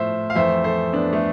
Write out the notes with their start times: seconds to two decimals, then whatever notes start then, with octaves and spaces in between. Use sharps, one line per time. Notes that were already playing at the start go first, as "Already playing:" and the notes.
Already playing: A2 F3 A3 C5 E5
0.30 F5
0.35 F2 E3 A3 C5 E5
0.64 A4 C5
0.93 B3 D4
1.13 A3